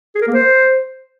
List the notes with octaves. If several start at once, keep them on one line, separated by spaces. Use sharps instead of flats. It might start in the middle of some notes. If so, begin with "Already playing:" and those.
G#4
A#4
A#3
C5